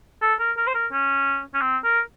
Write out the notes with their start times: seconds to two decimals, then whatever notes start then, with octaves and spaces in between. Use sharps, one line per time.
0.22 A4
0.40 A#4
0.57 A#4
0.68 C5
0.75 A#4
0.92 C#4
1.54 C#4
1.61 C4
1.84 A#4